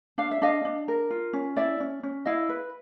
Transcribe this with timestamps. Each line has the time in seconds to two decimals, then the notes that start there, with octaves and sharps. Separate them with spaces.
0.18 D4 F5
0.31 E5
0.42 D4 D#5 F5
0.65 D4
0.88 A#4
1.10 F4
1.33 C#4
1.56 E4 D5 E5
1.80 C#4
2.03 C#4
2.25 E4 D#5 F5
2.49 B4